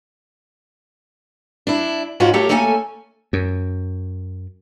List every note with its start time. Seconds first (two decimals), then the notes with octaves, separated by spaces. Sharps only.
1.67 D4 E4
2.20 G#2 G#3 C#4 F4 F#4
2.33 A3 G4 A4 A#4 C#5 F5
2.49 A3 A#3 C#4 A4 G5 G#5
3.33 F#2